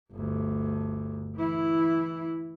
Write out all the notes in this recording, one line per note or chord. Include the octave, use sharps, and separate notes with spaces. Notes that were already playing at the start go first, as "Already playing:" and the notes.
G1 D2
E3 E4